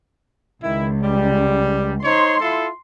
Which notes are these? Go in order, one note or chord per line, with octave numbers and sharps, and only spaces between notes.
C#2 D#3 E4
G3
D#4 C5 C#5 C6
E4 F4 A4